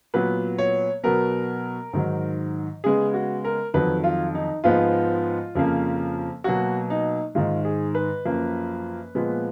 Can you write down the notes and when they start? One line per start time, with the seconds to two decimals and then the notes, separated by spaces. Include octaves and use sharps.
0.14 A#2 F#3 B3 B4
0.58 C#5
1.04 B2 F#3 B3 A#4
1.93 G#2 D#3 F#3
2.84 C#3 G#3 B3 G#4
3.14 F#4
3.45 A#4
3.74 F2 D#3 F#3 B4
4.04 F4
4.35 D#4
4.64 G#2 F3 G#3 B3 F4
5.55 F2 C#3 F3 A#3
6.44 B2 F#3 A#3 F#4
6.90 D#4
7.35 G#2 D#3 G#3 F4
7.65 G#4
7.95 B4
8.25 F#2 F3 A#3
9.15 A#2 F3 G#3 B3